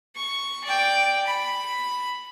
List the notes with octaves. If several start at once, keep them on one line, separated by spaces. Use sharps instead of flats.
C#6
D5 G5
B5